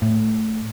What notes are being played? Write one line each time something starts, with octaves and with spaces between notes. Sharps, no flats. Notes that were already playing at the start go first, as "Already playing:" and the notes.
A2